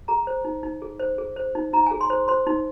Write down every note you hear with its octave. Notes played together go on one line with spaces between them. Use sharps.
G#4 A#5
C5
D#4
D#4
G#4
C5
G#4
C5
D#4
D#4 A#5
G#5
G#4
C6
C5
C5 C6
D#4